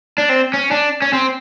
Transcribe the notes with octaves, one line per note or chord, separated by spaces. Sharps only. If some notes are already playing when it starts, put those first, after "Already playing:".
D4
C4
C#4
D4
C#4
C4